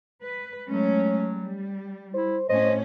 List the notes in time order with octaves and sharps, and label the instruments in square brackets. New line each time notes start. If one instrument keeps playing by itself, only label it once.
[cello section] B4
[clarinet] F#3 [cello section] G#3 A3 C#4
[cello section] G3
[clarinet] E4 [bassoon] C5
[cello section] A2 C#4 [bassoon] C5 [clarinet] D#5